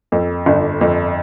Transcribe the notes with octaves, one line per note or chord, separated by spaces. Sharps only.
F2
G1
F2